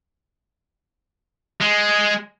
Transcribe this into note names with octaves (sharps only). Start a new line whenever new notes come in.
G#3